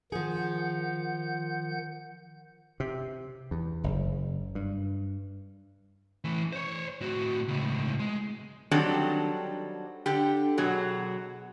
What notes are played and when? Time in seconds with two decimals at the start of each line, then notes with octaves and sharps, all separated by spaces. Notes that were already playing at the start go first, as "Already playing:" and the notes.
0.12 D#3 F3 G#4 F#5 G6
2.80 C3
3.51 E2
3.84 F#1
4.55 G2
6.24 E3 A3
6.53 C5 C#5
7.01 A2 F#4
7.48 C#2 A2
8.00 G#3
8.71 D#3 F#3 G3 C4 D4 A4
10.06 D3 G4
10.57 B2 F#3 G#4